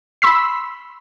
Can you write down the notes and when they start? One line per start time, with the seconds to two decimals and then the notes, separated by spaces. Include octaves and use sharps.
0.22 B5 C6 E6 B6